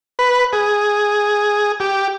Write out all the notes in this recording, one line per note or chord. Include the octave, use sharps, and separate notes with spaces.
B4
G#4
G4